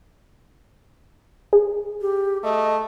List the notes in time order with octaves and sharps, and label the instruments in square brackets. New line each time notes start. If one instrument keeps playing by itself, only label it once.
[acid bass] G#4
[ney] G4
[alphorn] A3 [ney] D#5